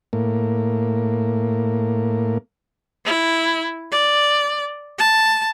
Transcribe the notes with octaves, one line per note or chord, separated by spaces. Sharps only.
A2 A#3
E4
D5
A5